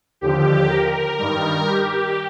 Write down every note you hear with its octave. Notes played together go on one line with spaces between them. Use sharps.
D#2 D3 F3 G4
A#4
G2 D#3 G3 A#4
G4